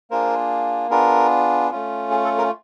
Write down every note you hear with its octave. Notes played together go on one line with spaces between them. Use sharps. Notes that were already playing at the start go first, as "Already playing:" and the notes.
A#3 D4 F4 G#4 A#4 C5
B3 D4 F4 G#4 A#4
A3 C#4 F4
G#4
A4
G#4 A#4